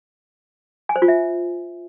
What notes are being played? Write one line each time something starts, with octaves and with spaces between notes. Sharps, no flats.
G#5
C5
F4
E5